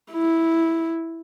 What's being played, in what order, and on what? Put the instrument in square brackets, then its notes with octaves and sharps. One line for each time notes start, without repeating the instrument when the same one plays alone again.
[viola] E4